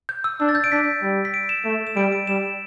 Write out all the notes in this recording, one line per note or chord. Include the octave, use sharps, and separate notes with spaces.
G6
E6
D4 E6
A6
G6
D7
D4 B6
G3
B6
D7
E7
A3
E7
G3 D7
D7
G3 E7